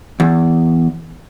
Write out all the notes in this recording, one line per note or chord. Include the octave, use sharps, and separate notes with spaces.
E2